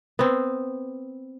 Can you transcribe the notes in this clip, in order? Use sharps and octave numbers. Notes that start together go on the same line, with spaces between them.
B3 C4